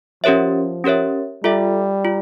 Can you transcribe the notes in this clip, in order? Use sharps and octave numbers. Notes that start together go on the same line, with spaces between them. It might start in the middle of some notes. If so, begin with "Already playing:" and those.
F3 C#4 G4 A#4 C#5 E5
C#4 G4 A#4 C#5 E5
G3 F4 A4 E5
F4